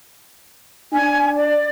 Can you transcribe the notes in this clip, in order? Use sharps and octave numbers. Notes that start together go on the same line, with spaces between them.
D4 G#5
D5